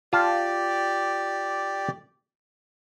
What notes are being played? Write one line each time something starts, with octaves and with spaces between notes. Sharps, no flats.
F4 G4 D5 A5